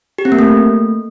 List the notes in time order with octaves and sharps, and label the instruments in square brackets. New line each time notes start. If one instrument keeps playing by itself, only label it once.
[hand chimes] G4
C4
A#3
A3